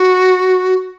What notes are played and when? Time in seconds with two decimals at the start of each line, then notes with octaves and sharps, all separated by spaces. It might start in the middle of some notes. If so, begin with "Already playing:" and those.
Already playing: F#4